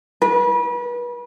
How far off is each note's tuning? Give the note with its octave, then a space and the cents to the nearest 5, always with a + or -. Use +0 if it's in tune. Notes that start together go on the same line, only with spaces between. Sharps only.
B4 -35